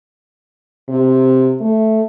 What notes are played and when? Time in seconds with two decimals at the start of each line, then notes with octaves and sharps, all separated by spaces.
0.89 C3
1.61 A3